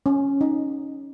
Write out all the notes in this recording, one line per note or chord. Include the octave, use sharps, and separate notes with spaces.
C#4
D#4